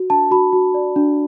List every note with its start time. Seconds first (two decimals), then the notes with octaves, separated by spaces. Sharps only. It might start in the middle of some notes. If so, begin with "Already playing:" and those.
Already playing: F#4
0.10 D4 A5
0.31 F#4 B5
0.53 F#4
0.74 D5
0.96 D4